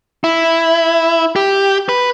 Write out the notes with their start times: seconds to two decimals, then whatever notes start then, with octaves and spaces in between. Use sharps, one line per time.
0.24 E4
1.36 G4
1.89 B4